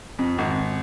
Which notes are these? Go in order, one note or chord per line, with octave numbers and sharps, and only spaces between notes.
F2
G#1